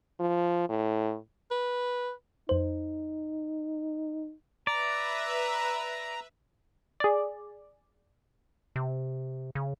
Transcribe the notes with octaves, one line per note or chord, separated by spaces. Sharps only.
F3
A2
B4
F2 D#4 C5
B4 D5 E5 A#5
G#4 D5
C3
C#3